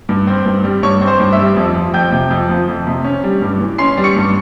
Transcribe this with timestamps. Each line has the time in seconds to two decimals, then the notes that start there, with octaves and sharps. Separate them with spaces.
0.09 G2
0.27 C4
0.46 G2
0.64 G3
0.83 G2 C#5 C#6
1.01 C4
1.07 C5 C6
1.20 G2
1.32 E5 E6
1.39 G3
1.57 F2
1.75 F3
1.94 F2 G5 G6
2.12 C3
2.31 F2
2.49 F3
2.68 F2
2.87 C3
3.05 C#4
3.24 G3
3.42 G2
3.61 E3
3.78 C#4 C6 C7
3.97 G3
4.04 C#6 C#7
4.16 G2